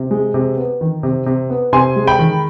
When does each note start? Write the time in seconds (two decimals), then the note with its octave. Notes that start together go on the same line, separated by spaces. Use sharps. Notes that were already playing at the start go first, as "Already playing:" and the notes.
Already playing: C3
0.11 G#3
0.34 C3
0.57 B3
0.81 D#3
1.03 C3
1.26 C3
1.50 B3
1.73 C3 G#5 C6
1.96 G#3
2.07 G5 B5
2.19 D#3